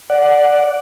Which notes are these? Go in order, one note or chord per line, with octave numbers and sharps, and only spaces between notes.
D5 F#5